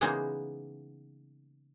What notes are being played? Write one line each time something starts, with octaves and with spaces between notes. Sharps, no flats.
C#3 E3 G#3 A#3 B3 D#4